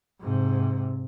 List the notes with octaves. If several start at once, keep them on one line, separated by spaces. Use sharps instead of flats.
G#2 C3